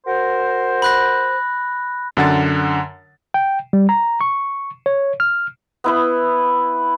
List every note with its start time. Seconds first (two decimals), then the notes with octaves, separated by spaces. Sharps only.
0.06 F#4 A#4 C5
0.82 B5 F#6 A#6
2.17 F#2 D3 F#5 A6
3.34 G5
3.73 G3
3.89 A#5
4.21 C#6
4.86 C#5
5.20 F6
5.84 B3 E4 B4